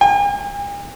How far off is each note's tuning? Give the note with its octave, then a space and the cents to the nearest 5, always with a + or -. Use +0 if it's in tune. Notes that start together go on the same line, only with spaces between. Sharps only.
G#5 -45